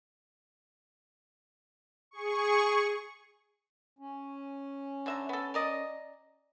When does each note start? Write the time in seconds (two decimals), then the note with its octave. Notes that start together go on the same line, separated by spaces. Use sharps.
2.11 G#4 C#6
3.99 C#4
5.06 D3 E5 A#5
5.29 B3 A4
5.54 A#4 D5 D#5